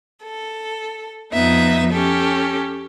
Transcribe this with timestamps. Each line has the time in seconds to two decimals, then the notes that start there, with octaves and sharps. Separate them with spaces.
0.22 A4
1.33 F2 F3 B3 D#4 E5
1.92 C#4 G4 A4